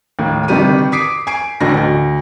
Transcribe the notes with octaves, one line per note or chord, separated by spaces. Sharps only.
D#2 A2 A#3
G1 C3 D#3 G3 G4 D#7
D6 D#6 B6 C7 D7
G#5 C7 D7
A1 D2 A2 D3 F#4 A#6
D2